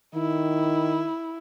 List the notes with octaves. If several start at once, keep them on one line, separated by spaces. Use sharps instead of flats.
D#3 E4